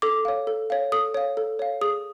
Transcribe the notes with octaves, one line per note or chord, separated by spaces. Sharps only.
A4 D6
C#5 F5
A4
C#5 F5
A4 D#6
C#5 F5
A4
C#5 F5
G#4 D#6